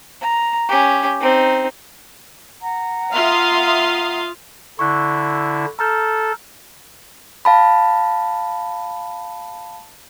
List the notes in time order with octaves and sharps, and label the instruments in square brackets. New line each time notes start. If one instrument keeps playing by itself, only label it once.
[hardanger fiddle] A#5
C#4 G4
C4 D#4
[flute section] F#5 A#5
[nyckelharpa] F4 F5 [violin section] E5 C6 D#6
[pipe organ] D3 E4 [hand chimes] C#6 F#6
[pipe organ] A4 [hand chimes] A#5 F6 G6
[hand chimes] F5 A5 B5